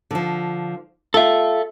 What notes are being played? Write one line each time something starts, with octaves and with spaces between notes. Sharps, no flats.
D3 F3
F4 A4 E5